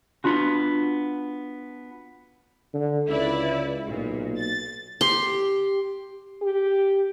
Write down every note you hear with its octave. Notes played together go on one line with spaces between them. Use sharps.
B3 D4 F4 F#4
D3
C#2 E4 B4 D5
B1 A#2
A6
G4 C6
G4